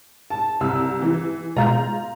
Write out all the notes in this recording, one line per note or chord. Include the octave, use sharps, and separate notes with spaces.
A5
C2 E6
E3
B2 G#3 F4 A#5 G6